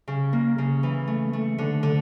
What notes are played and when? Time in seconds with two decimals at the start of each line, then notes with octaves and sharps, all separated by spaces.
0.08 C#3
0.33 A#3
0.58 C#3
0.83 E3
1.07 A3
1.33 A3
1.58 D3
1.83 D3